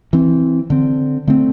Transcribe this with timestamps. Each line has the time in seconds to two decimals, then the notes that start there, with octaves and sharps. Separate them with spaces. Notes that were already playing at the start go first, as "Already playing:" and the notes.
0.13 E3 C4
0.70 D3 C4
1.27 D3 A3 C4